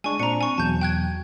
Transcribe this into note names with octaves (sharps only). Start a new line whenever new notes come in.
G#3 D4 G#5 C#6
A#2 C4 D4 A#5 C#7
G#5 C#6
E2 B2 F#3 A5 G6
G5 F#6 G#6